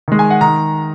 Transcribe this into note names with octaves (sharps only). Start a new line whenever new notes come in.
D#3 G#3
G#5
F#5
D#3 A#5